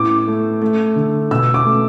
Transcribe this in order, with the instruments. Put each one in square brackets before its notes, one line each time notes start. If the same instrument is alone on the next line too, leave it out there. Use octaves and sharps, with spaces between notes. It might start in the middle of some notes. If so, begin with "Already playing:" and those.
Already playing: [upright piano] A2 B3 D6
A3
A3
D3
B2 E6
D6
A3